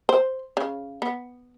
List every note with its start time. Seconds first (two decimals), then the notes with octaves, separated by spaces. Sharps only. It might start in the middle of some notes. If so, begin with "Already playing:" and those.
0.09 C5
0.57 C#3
1.02 B3